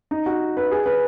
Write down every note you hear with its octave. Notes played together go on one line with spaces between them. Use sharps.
D#4
F#4
B4
G#4
B4